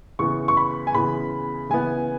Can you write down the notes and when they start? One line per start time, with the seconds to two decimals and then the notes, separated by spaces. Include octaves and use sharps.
0.19 C#3 E3 B3 C#6
0.48 C#6
0.57 B5
0.87 G#5
0.95 C#3 E3 B3 B5
1.70 C#3 E3 B3 G#5